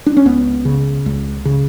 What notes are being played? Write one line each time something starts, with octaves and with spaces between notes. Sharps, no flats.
D4
C#4
C#2 B3
C#3
C#2
C#3